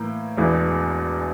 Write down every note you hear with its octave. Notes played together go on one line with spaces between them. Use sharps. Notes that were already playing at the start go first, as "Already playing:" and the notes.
Already playing: A2 E3 A#3
E1 E2 E3